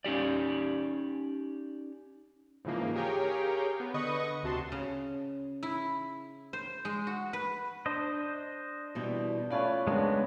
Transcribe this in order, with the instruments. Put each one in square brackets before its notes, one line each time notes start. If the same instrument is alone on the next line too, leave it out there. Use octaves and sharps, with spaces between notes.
[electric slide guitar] C#4 D#4 G4 D5
[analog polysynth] G#2 C#3 E3 F3 A#3
G4 G#4 A#4 C#5 F5 G5
B3
D3 B4 D#5 C#6 D#6
D2 C3 F#4 A5 C6
[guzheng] C#3
E4
C5
G#3
F#4
B4
[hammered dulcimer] D4 [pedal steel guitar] C5 D#5
[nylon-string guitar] B2 E3 G3
[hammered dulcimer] A3 C#4 B4 [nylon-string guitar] F4 D5 F5
[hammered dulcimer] C#3 C4 D4 [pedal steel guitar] G#3 B3 [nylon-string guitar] A#4